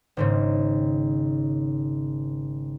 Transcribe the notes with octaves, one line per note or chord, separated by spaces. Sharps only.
G#1 G#2 C#3